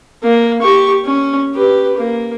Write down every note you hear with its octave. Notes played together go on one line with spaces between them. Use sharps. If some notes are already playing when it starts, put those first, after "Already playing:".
A#3
G4 C#6
C#4
G4 B4
A#3